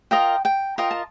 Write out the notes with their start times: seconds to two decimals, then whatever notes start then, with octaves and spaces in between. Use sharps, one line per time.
0.11 F4 A#4 D#5 G5
0.45 G5
0.78 F4 A#4 D#5 G5
0.91 A5